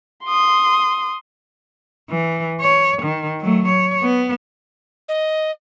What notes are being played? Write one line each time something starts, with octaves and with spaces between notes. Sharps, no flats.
C6 D#6
E3
C#5
D#3
F#3 A3
C#5
B3
D#5